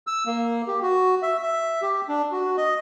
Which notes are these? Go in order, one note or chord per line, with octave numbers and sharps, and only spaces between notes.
E6
A#3
G4
F#4
E5
E5
G4
D4
F#4
D#5